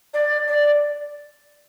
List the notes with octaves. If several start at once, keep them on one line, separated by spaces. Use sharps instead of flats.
D5
D5